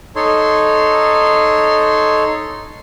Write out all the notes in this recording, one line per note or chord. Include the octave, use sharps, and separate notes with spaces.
D#4 A4 C#5 C6